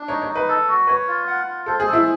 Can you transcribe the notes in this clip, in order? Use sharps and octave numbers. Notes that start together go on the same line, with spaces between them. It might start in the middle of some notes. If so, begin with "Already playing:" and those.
Already playing: D4
D#4 C#5
C#5
D#4
B4
A4
F#4
B4 C#5
F4
F#5
F4
A4 C5
G#4
A4
E4